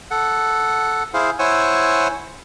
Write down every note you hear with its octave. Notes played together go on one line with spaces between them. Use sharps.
A4 F#5
E4 G#4 C5 F5
E4 C5 C#5 F#5 G#5 E6